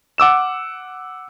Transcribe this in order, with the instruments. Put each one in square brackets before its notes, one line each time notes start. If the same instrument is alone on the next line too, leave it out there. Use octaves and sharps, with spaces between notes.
[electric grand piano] F#5 D6 E6 E7